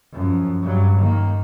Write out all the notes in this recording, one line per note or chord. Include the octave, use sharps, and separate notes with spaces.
F#2 F3
G2 F#3
D#3 A#3